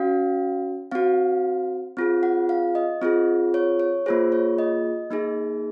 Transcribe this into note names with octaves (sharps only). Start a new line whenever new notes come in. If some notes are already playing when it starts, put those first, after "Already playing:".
Already playing: C#4 F#4 F5
C4 F#4 F5
C4 F4 G#4
F#5
F5
D#5
C4 F4 G#4
C#5
C#5
A#3 F4 G#4 C5
C#5
D#5
A#3 D#4 G#4